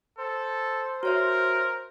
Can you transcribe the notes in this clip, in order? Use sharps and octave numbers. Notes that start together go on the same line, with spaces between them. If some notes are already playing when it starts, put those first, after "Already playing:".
A4 C5
F#4 A#4 C#5 E5